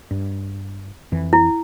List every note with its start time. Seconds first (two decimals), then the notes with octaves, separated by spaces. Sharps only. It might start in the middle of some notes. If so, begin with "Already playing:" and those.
0.11 G2
1.12 F2 E3
1.33 E4